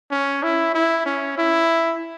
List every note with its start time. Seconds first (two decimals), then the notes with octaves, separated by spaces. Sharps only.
0.11 C#4
0.43 E4
0.74 E4
1.06 C#4
1.38 E4